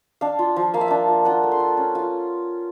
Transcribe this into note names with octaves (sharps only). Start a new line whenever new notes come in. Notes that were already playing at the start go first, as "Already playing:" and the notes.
D4 F5
F4
F3
A#3 F5
E5
D4 F5
F4
F4 F#5
A3
C6
A3
C#4
F4